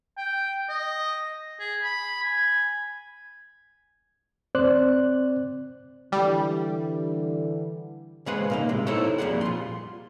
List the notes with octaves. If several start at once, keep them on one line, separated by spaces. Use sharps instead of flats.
G5
D#5
G#4
B5
G#5
C4 C5 D5 F#6
D3 E3 G3
C#3 G#3 G#4 B4 C5 F#5
A#2 A#3 D#4
A2 C3 G#3
D#4 E4 A4 C5 C#5
F2 A#2 G3 B3 G#4 F#5
F4 C6